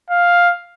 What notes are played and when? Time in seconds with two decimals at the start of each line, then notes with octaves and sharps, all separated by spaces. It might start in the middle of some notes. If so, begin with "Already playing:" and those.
0.10 F5